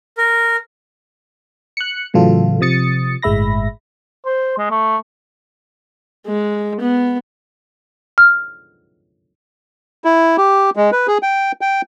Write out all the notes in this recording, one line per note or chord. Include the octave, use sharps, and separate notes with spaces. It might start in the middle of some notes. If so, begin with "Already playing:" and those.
A#4
F#6 C#7
A2 C#3 E3 F#3 F4 A4
C3 F3 D#6 A6 C#7
G1 A2 G#3 E5 B5 A#6
C5
G#3
A3
G#3
B3
F6
E4
G4
G#3
B4
G#4
G5
G5